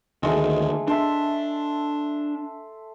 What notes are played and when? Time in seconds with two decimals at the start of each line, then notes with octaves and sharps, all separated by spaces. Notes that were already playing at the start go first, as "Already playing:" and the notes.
0.23 D2 D#3 G#3 A3 G#4
0.88 D4 E5 A5 C6